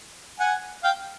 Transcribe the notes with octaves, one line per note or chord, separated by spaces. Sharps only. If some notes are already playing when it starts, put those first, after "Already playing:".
F#5 G#5
F5 G5